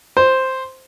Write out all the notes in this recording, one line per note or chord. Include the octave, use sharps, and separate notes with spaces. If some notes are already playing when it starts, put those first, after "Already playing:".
C5